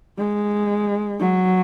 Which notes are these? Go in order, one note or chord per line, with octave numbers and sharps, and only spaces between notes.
G#3
F#3